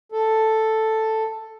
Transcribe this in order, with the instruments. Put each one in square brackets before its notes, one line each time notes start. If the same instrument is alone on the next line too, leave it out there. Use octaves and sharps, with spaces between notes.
[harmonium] A4